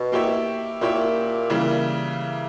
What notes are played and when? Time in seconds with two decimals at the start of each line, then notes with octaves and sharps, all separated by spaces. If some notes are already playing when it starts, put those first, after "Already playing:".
Already playing: B2
0.12 A#3 E4 G4 C#5 E5
0.81 A#2 A#3 E4 G4 C#5 E5
1.50 C#3 E3 G3 A#3 E4